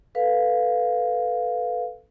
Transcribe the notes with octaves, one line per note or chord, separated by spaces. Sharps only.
A4 B4 F5